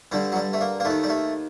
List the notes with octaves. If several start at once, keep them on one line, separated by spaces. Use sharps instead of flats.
G2 D3 G3
F#3
G3
A3
A#3
A#3
D#2 D#3 A3
G3
A3